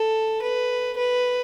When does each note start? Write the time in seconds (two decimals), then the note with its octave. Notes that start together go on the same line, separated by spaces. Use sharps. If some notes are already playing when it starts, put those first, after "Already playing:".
Already playing: A4
0.42 B4
0.97 B4